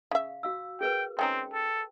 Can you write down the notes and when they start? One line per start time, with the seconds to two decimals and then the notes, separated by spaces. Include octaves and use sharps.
0.11 C#3 E5 F5
0.43 F#4 F5 E6
0.81 G#4 A#4 B4 G5
1.19 G#3 C4 C#4 D#4 G5
1.53 A4